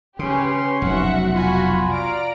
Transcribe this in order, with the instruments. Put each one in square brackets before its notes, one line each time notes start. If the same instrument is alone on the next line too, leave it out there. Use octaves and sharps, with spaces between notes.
[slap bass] C#3 [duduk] C#4 [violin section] G4 G#4 B4 [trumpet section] C6
[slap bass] F1 B1 [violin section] F#4 E5 F#5
[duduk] F4 [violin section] F#4 [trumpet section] G#5 B5
[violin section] D5 A#5 D7 [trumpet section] F5